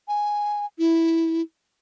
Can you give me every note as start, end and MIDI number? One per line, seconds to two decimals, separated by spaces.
0.08 0.66 80
0.79 1.42 64